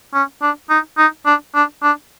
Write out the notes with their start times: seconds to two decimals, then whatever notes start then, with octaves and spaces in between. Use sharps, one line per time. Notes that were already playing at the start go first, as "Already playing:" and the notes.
0.14 C#4
0.42 D4
0.70 D#4
0.98 D#4
1.26 D4
1.55 D4
1.83 D4